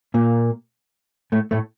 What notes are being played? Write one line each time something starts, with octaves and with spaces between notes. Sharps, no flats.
A#2 A#3
A2 A3
A2 A3